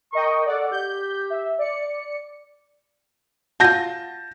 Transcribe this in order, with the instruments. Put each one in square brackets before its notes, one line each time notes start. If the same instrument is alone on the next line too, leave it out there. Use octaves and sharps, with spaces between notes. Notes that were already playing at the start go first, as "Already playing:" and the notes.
[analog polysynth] A#4 D#5 G5 [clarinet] C#6
[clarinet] A4 [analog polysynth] D5 F#5
[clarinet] G4 [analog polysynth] G6
[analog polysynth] E5
D5 C#7
[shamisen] F4 F#4 [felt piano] A5 G6 A#6